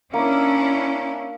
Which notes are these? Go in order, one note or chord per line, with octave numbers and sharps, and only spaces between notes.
A#3 C#4 D4 E4